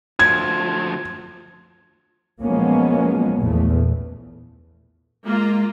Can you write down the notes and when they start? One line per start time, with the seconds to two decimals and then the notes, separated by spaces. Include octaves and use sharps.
0.19 D2 F3 G#6
2.41 F3 F#3 G#3 A#3 B3 C#4
3.39 A#1 E2 A3
5.25 G#3 A#3 F4